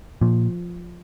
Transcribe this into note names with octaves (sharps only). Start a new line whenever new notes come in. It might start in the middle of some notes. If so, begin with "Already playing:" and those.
A#2 F3